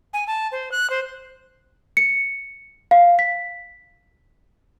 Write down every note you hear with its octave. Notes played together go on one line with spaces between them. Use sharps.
G#5
A5
C5
F#6
C5
C#7
F5
B6